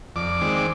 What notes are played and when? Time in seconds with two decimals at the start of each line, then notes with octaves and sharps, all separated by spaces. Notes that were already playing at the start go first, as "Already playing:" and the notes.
0.16 F2 D5 D6
0.41 D#3 G#3 C4
0.56 D6